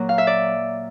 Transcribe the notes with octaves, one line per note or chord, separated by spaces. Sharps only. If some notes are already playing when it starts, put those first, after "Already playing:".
Already playing: A#2 F#3 A#3
F5
E5
D5